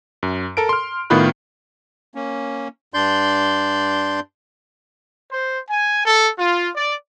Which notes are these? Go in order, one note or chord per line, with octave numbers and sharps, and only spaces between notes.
F#2
A4 A#4 D7
C6 F6
A2 D#3 B3 F4 B5 F#6
A#3 C#4
G2 D4 D5 C6 G6
C5
G#5
A4
F4
D5